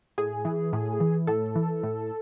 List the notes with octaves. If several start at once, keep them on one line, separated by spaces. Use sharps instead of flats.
A2 G#4
E3
A2
E3
A2 A4
E3
A2